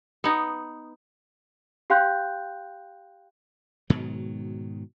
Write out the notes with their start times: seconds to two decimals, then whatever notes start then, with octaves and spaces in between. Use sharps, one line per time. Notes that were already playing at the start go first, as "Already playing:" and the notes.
0.24 B3 D#4
1.90 G4 F5 G5 C6 F#6 G6
3.90 G#2 B2 D#3 F#3